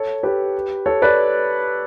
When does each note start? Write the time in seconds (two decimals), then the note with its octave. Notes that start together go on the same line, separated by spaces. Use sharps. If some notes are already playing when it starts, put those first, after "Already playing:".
Already playing: A4 C#5
0.23 G4 B4
0.86 A4 C#5
1.02 B4 D5